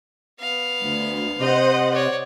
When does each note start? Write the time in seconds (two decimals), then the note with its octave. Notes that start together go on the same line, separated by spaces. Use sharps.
0.40 B3 F5
0.83 D2
1.40 C3 C5 D#5 F#5
1.93 C#5 D5